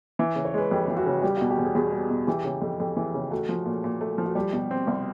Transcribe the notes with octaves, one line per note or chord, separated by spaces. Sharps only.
E3 E5
C#3
C#5
G#3 B4
F2 G4
E3 G4
F#4
C#3
G3 G4
B2 F#4
G4
E2
G#4
E2 G4
G3
B2
E3 G4
C#3
F2
F2
E3
C#3
A3 F#4
F3
A#2
A#2
A3
F3
F#4
G3 G4
B2 G4
C4
C2